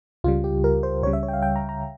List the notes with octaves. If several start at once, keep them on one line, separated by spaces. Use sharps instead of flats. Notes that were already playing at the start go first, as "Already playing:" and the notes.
C#2 C#3 G3 F4
G4
A#4
C5
C#2 C#3 G3 C#5
E5
C#5
G5
F5
G5
A#5
A#5